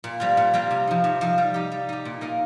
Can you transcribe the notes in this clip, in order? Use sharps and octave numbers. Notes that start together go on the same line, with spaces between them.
A#2
G3 C4 F4
A#2
G3 C4 F4
C3
F3 D#4
C3
F3 D#4
G3
D#4 G4
G3
D#4 G4
A#2
A#3 D#4 A#4 D#5